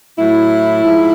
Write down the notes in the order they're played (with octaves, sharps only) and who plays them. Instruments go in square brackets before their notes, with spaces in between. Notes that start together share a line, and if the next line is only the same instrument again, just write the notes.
[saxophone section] A2 F#3 E4
G#2 F3